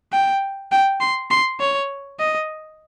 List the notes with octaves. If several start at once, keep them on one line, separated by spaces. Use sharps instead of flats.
G5
G5
C6
C6
C#5
D#5